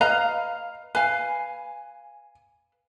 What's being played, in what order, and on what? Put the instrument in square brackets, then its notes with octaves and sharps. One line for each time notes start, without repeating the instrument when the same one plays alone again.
[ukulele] B4 D#5 A#5 [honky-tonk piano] F5
[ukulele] B4 F5 [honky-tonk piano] G#5